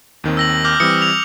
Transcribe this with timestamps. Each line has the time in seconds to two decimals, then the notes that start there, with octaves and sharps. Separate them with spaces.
0.24 D#2 D#3 C4
0.37 E6 A#6 F#7
0.64 D6 F6 G6
0.80 E3 G3 C4 D#6 C#7
1.02 F7